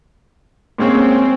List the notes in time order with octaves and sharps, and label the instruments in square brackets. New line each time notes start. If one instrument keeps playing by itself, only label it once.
[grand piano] A#2 G#3 C#4 G#4 C#5 [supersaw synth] C4